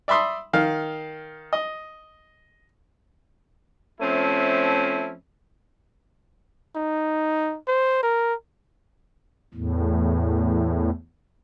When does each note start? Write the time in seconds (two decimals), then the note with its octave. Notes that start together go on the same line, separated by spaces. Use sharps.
0.08 D5 E5 B5 C6 D#6
0.53 D#3 F5
1.53 D#5
4.00 F3 A3 C4 C#4 E4
6.76 D#4
7.68 C5
8.03 A#4
9.54 E2 A2